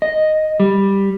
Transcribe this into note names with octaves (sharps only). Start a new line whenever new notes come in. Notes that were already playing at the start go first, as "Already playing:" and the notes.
D#5
G3